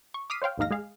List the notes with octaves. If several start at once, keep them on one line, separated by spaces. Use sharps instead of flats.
C#6
D6 D#6 F6 B6 C7 D#7
C5 C#5 F5 G5
A#1 D#2 G#2 D#4 F5 A#6
G#3 G#4 F5